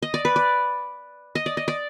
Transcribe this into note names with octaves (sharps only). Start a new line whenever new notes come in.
D#5
D5
B4
D5
D#5
D5
D#5
D5